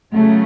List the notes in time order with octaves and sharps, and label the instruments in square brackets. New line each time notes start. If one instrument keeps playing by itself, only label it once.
[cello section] C#3 F#3 A3